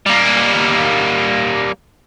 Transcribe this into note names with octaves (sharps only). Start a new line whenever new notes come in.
G3 A#3